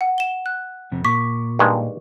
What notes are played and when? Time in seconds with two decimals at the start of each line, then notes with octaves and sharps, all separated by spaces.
0.01 F#5
0.18 E7 G7
0.46 F#6
0.92 F2 C3
1.05 A#2 C#6 D6 B6
1.59 G2 D#3 G#3